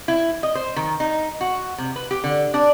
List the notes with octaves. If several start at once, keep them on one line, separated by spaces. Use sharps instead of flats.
E4
D#5
C5
D#3
D#4
F#4
C3
B4
G4
D3
D4